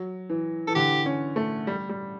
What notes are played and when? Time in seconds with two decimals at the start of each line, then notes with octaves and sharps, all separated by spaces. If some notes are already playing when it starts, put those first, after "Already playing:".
Already playing: F#3
0.30 E3
0.68 E3 A4
0.75 D3 G4
1.06 C#4
1.36 A3
1.67 G3
1.89 G3